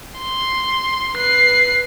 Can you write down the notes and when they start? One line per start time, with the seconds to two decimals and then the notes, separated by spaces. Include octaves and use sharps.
0.19 C6
1.15 B4 C7